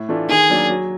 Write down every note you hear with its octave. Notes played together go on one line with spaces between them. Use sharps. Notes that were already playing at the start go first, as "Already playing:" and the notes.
Already playing: A2
E3 A3 D4 F4
D#3 G#4
F#3 A#3 D4
F#3